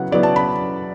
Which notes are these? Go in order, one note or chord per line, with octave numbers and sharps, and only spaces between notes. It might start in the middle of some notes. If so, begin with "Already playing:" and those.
Already playing: C#3 F#3 B3 E4 F#5
C#3 F#3 B3 E4 D5
A5
B5